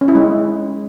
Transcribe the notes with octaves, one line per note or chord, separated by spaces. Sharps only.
C#4
E4
G#3